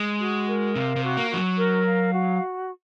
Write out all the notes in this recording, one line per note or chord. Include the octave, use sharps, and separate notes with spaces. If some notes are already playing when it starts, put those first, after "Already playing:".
Already playing: G#3
F#4
A#4
C3 F5
C3
F#4
A#3
F3 F#4
F#3
A#4
F5
F#4